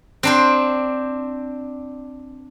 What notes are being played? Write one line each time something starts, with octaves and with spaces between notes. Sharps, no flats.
C4 D4 C5